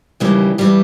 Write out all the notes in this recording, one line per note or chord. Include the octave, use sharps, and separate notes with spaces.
D#2 C#3 E3 G3
G2 E3 G3